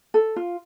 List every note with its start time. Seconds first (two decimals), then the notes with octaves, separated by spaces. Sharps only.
0.14 A4
0.36 F4